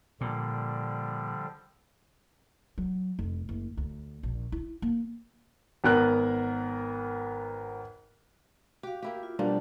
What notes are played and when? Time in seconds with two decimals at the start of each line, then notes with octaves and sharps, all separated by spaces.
0.21 A#2 D3 F3 G3
2.78 F#3
3.19 F1
3.49 F#1
3.77 D2
4.23 A#1
4.52 E4
4.82 A#3
5.84 G#1 B3 A#4 F#6
8.83 F#4 G4 F5
9.02 A#3 E4 G4
9.23 F4
9.39 B2 F3 G3 A#3 D4